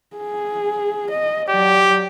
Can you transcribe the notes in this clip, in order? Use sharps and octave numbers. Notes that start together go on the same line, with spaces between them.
G#4
D#5
F#3 G4 D5